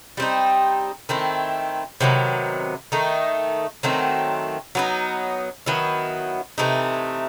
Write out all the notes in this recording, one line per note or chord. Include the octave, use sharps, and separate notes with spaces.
G3 C4 D#4
D#3 A3 C4 E4
C3 D#3 F#3 B3
D#3 A3 D#4
D#3 F#3 A3 C4
F#3 B3 D#4
D#3 F#3 B3 E4
C3 E3 A3 D#4